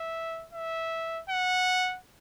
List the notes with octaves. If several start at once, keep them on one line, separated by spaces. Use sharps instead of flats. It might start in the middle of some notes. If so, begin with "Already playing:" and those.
Already playing: E5
E5
F#5